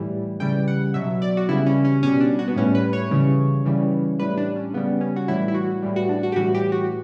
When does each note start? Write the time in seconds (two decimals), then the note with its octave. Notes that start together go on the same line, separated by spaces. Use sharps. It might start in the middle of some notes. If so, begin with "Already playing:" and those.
Already playing: A2 E3 G3
0.40 C#3 E3 G3 G5
0.68 F#5
0.94 B2 F#3 E5
1.22 D5
1.37 F#4
1.49 C#3 E3 G3 E4
1.66 C#4
1.85 C#4
2.03 B2 G3 C#4
2.20 D4
2.39 F#4
2.48 B3
2.56 A2 G3 C#4
2.75 B4
2.93 C#5
3.11 C#3 E3 G3
3.66 C#3 E3 G3
4.19 A2 G3 B4
4.37 D4
4.56 C#4
4.74 C#3 G3 B3
5.01 C#4
5.16 F#4
5.28 A2 E3 G3 E4
5.48 E4
5.54 F#4
5.82 A2 E3 G3
5.96 F#4
6.09 D4
6.23 F#4
6.32 G4
6.36 A2 E3 G3 F#4
6.55 G4
6.72 F#4